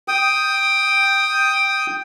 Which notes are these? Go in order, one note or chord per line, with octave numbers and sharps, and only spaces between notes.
G5 D#6